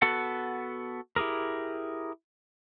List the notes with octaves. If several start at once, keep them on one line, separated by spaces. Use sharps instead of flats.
B3 F#4 A4 F#5
E4 G4 G#4 A#4